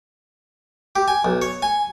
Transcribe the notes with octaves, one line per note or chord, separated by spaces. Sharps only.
G4
G#5
B1
C#5
G#5